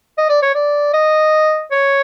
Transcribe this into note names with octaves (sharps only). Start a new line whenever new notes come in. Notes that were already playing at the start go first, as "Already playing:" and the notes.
D#5
D5
C#5
D5
D#5
C#5